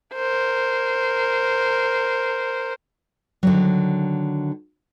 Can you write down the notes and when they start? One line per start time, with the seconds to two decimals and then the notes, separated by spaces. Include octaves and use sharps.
0.15 A#4 C5
3.43 D3 D#3 F#3